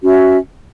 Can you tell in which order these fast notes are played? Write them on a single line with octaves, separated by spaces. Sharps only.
F#4 C#4 E5